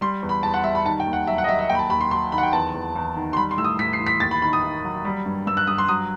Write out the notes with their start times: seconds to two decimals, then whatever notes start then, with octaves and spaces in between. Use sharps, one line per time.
0.01 G3 C6
0.23 E2
0.29 B5
0.43 E2 A5
0.54 F#5
0.64 G3 E5
0.75 B5
0.85 D#3 A5
1.00 G5
1.06 D#2
1.13 F#5
1.27 F#3 E5
1.38 F#5
1.44 D#5
1.49 F#3 E5
1.59 E5
1.69 D#2 G5
1.75 B5
1.79 A5
1.90 D#2 B5
2.01 C6
2.11 F#3 C6
2.32 D#3 B5
2.38 F#5
2.43 G5
2.53 E2 A5
2.74 E2
2.96 E2
3.16 D#3
3.33 C6
3.37 G3 B5
3.51 C6
3.58 A2 E6
3.64 D#6
3.79 A2 B6
3.93 C7
4.00 E3
4.06 B6
4.20 D#2 A6
4.31 B5
4.42 D#3 B5
4.53 D#6
4.63 D#3
4.84 F#3
5.05 G3
5.26 G2
5.47 G2 E6
5.57 F#6
5.67 G2 D#6
5.78 C6
5.88 F#3 D#6